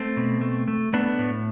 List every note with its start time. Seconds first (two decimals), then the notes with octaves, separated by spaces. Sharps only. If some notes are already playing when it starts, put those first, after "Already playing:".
Already playing: A3 C4
0.17 B2
0.41 A3
0.68 A3
0.93 A3 B3 D4
1.19 A2